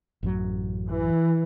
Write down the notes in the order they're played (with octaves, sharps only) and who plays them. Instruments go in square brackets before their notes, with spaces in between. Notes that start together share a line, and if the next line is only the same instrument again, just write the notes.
[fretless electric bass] A1 F#2 F#3
[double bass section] E3